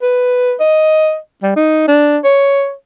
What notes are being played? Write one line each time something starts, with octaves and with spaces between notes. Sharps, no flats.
B4
D#5
G3
D#4
D4
C#5